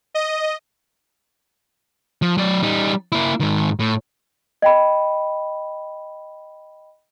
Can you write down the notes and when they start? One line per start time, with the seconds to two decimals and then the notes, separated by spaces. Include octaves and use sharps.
0.14 D#5
2.22 F3
2.37 F#3 D5
2.63 G3 D#4
3.12 A#3 E4
3.40 G#2 D#3
3.79 A2
4.62 D#5 G5 B5